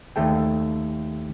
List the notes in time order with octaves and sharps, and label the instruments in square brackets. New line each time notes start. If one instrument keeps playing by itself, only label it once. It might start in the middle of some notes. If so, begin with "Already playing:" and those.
[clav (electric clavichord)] D#2 A3 A4 G5